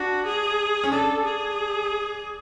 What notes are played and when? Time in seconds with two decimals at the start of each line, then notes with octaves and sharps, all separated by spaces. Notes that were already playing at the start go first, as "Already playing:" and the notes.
Already playing: D4 F#4
0.25 G#4
0.84 C#4
0.92 D4 A4
1.25 G#4